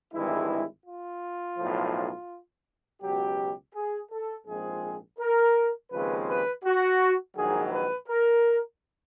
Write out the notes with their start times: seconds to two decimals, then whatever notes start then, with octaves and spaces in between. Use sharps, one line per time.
0.13 G#1 G2 E3 G#3 E4
0.86 F4
1.58 B1 A2 F3
3.02 C#2 B2 F#3 G4
3.74 G#4
4.10 A4
4.47 A#1 G#2 F3 G#3 C4 G#4
5.19 A#4
5.91 D#2 C#3 F3 G#3 C4 B4
6.27 B4
6.64 F#4
7.36 A#1 G#2 D#3 F#3 G#4
7.72 B4
8.08 A#4